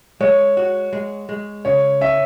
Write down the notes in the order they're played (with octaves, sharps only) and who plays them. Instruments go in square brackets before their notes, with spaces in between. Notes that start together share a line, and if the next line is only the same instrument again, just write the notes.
[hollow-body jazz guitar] G#3 [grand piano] C#5
[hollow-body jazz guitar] F#4
G#3
G#3
[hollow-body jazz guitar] C#3 [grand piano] C#5
[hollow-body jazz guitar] C#4 [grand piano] E5